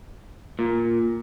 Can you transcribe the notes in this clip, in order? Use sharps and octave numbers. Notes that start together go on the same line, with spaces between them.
A#2